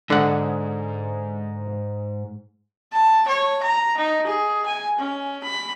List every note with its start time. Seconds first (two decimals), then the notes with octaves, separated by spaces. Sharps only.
0.10 G#2 D3 F#5
2.92 A5
3.28 C#5
3.63 A#5
3.97 D#4
4.26 G#4
4.66 G#5
4.99 C#4
5.43 B5